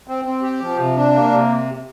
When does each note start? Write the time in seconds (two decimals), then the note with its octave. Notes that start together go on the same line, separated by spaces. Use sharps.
0.08 C4
0.25 C4
0.42 G4
0.61 F3
0.78 C3
0.96 D4
1.13 A#3
1.31 C3